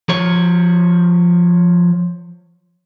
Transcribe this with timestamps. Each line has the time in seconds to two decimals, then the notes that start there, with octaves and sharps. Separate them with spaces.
0.09 F3 C#5